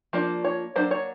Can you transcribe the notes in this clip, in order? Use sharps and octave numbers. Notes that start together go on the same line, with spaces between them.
F3 A#3 D4
C#5
F#3 A#3 D4 C5
C#5